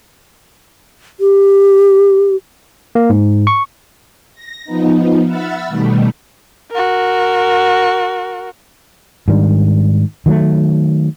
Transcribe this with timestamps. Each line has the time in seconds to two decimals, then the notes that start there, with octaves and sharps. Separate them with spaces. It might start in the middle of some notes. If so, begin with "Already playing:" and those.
1.20 G4
2.95 A#3
3.10 G#2
3.47 C#6
4.34 A#6
4.65 F3 B3 D#4
5.25 E5 F#5 B5 E6 F6 A6
5.68 B2 D#3 G3 A3
6.71 F#4 A#4
9.28 G#2 D#3 G3 D4
10.26 D#3 F#3 G#3 A3